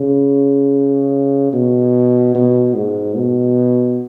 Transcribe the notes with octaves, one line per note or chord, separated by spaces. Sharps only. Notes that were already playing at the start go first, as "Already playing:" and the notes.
Already playing: C#3
B2
B2
G#2
B2